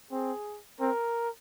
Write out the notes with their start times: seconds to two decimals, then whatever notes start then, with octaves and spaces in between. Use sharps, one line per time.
0.11 C4 G#4
0.80 C4 A#4